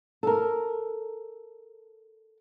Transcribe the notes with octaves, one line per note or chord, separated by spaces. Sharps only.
A4 A#4